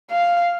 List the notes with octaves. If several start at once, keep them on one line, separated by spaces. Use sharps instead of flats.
F5